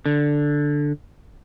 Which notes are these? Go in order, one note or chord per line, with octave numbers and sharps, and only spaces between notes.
D3